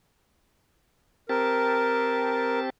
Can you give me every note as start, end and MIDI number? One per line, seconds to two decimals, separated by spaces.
1.29 2.70 60
1.29 2.70 67
1.29 2.60 70
1.29 2.70 81